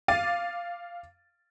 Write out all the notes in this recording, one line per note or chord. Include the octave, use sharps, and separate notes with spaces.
F5 D6 A6 D#7